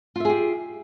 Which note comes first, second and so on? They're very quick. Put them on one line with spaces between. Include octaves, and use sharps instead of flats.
F4 E5 G#4 G4